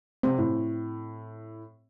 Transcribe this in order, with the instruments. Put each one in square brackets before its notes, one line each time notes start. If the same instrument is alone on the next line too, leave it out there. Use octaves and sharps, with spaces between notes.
[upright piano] C3 [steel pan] C4
[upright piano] A2